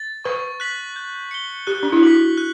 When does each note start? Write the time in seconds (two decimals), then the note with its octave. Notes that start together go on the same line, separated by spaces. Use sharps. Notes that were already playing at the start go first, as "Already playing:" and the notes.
Already playing: A6
0.24 B4 C#6
0.60 F#6 B6 F#7
0.96 G6
1.31 C#7 G7
1.67 G4 F#6
1.83 D4
1.92 E4
2.03 F#4 B6 F#7
2.38 F#6